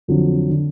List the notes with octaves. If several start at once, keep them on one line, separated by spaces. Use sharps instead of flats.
F2 D3 F#3
D3